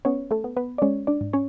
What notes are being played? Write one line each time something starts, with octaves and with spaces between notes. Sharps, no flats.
B3 C#4 C#5
A3 A4
B3
B3 B4
D5
G#3 C#4 C#5
D4 D5
G#2
C#4 C#5